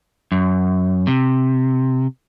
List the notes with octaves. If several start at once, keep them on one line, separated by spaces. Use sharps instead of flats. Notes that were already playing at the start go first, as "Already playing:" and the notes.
F#2
C3